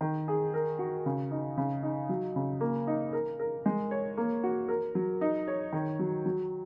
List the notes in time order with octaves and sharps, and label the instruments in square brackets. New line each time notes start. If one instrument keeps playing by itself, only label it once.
[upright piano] D#3
G#4
A#4
F#4
C#3
D#4
C#3
D#4
F#3
C#3
A#3
D#4
A#4
A#4
G#3
C#5
A#3
F#4
A#4
F#3
D#4
C#5
D#3
F#3
F#3